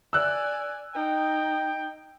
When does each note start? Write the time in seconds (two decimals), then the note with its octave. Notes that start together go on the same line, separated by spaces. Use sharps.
0.13 D5 G#5 E6 F#6
0.95 D#4 G5